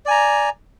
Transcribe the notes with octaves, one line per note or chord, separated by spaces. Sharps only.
D5 G#5 A#5